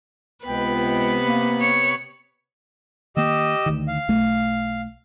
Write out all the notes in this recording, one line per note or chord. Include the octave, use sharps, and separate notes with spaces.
C#2 C3 B3 B4 G5
A#3
C#5
D#3 A#3 G4 D#5 E6
D2 D#3
F5
B1 A3